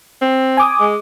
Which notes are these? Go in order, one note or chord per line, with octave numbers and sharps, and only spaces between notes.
C4
G#5 D6 D#6
G#3